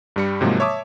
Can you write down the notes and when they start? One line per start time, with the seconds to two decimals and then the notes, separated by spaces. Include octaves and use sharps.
0.16 G2 G3 C#7
0.41 G#2 C3 F3 F#3 G#3 A#3
0.60 C#5 E5 A5 D6 D#6